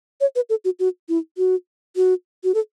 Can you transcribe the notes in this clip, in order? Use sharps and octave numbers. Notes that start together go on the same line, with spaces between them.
C#5
B4
A4
F#4
F#4
E4
F#4
F#4
F#4
A4